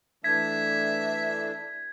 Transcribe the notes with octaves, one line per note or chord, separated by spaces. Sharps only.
E3 A3 D4 E5 G#6 B6